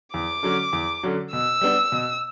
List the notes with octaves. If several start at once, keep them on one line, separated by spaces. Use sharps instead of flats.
E2 D6
D3 F#3 C#4
E2
D3 F#3 C#4
B2 E6
G3 B3 D4
B2